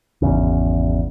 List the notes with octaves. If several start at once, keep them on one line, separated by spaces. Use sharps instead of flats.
G#1 E2 C#3